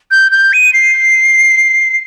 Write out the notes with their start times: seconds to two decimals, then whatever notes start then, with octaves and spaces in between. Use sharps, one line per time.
0.11 G6
0.32 G6
0.53 D#7
0.73 C7